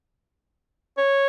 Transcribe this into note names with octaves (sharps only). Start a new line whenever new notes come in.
C#5